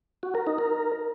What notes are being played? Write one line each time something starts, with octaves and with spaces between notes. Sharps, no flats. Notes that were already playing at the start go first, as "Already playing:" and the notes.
F#4
A#4
D#4
A#4